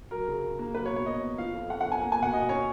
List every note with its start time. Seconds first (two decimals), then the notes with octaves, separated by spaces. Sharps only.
0.11 F#3 A#4
0.28 C#3
0.44 C#3
0.59 A#3
0.75 F#3 B4
0.86 C#5
0.90 B2
0.96 C#5
1.06 B2 D#5
1.22 B3
1.38 F3 F5
1.54 F2
1.70 F2 F#5
1.81 B3 F#5
1.92 G#5
2.01 A#3
2.12 G#5
2.18 B2 F#5
2.33 B2 D#5
2.49 C#4 C#5